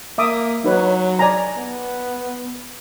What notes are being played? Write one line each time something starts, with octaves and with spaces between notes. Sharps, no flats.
A#3 E5 D6 D#6
F#3 D#4 B4 C#5
D5 G#5 A#5
B3